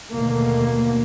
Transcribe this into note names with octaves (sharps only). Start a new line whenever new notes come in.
D#2 B2 D3 A3 A#3